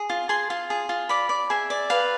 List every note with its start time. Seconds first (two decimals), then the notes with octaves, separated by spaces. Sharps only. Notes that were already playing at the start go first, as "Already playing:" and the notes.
Already playing: G#4
0.10 F4
0.29 G#4 C6
0.50 F4
0.70 G#4
0.89 F4
1.09 D5 B5
1.29 D5
1.50 G#4 E5
1.70 D5
1.90 B4 F5